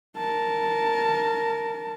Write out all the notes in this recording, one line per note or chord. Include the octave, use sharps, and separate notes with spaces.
A#4 A5